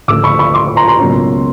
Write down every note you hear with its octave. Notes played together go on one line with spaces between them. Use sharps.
D2 C#3 F3 A3 D6 E6
B5 C#6
B5 C#6
C6 D6
A#5 C6
A#5 C6
C#2 B2 F#3 A#3 C#4